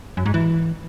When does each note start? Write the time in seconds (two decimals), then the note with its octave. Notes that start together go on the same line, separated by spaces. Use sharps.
0.17 F#2
0.26 G#2
0.34 E3